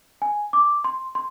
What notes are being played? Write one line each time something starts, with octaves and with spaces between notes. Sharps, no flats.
G#5
D6
C6
C6